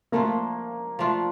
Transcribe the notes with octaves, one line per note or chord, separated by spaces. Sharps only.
F3 A3 A#3 D4 F4
F3 A3 D4 F4